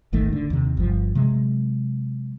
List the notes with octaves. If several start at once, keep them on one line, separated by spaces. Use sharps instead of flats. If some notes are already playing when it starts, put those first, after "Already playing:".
D#1 G#1 D#3 A3
D3
D#2 C3
G1 F3
C3 F#3 G#3